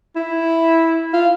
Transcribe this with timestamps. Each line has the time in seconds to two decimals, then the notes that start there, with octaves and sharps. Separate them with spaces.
0.16 E4
1.13 F4